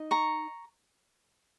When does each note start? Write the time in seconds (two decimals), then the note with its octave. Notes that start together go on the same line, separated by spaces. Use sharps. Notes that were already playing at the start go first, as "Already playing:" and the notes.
Already playing: D#4 D#5
0.11 A#5 C#6